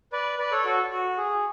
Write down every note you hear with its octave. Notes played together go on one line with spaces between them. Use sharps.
B4 D5
B4 D5
A4 C#5
F#4 A4
F#4
G#4